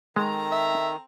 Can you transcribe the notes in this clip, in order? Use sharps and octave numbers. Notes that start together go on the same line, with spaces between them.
D#3 G#3 C4 A4 A#5
E5